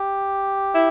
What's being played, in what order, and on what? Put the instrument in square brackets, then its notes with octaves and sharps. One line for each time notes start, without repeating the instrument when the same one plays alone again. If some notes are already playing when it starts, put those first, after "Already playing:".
Already playing: [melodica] G4
[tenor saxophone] E4